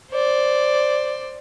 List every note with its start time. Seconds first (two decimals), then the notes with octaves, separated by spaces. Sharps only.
0.11 C5 D5